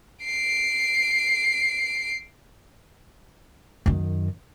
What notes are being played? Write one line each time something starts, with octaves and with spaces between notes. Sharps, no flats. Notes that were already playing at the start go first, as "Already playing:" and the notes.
C7 D7
F#2 D#3